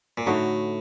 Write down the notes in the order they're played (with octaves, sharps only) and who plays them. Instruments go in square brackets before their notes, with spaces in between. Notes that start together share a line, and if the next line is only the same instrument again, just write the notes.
[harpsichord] A#2
[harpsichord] A2 [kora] D3 A3 D#4 F#4